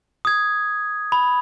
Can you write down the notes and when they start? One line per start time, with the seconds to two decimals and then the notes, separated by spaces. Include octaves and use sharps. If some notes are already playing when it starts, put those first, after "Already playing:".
0.25 D#6 G#6
1.12 B5